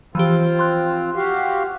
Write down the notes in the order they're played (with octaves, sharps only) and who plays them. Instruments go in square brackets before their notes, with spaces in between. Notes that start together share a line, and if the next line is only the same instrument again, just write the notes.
[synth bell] E3 F3 G4 [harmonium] C4 F4
[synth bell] C6 F#6
[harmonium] F#4 G4 F5